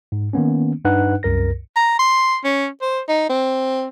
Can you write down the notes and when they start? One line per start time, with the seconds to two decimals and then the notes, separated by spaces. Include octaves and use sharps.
0.12 G#2
0.33 D#3 A#3 B3 C#4
0.85 G2 D4 D#4 B4 F#5 F#6
1.23 C2 F#2 A#4 A#6
1.76 A#5
1.99 C6
2.44 C#4
2.82 C5
3.09 D#4
3.30 C4